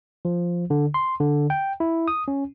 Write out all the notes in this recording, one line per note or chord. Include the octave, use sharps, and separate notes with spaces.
F3
D3
C6
D3
G5
E4
D#6
C#4